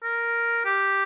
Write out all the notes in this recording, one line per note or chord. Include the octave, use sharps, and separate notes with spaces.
A#4
G4